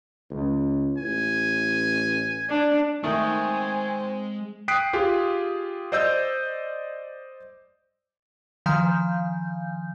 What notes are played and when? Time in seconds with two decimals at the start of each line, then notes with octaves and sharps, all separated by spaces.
0.30 C#2
0.98 A1 G#5
2.49 D4
3.03 D#3 G#3 A3 C4 G#5
4.68 G5 D#6 F#6 B6 C7 D7
4.93 F4 G4 G#4
5.92 C5 D5 D#5 E6 G6
8.66 D#3 F3 F5 G#5 G6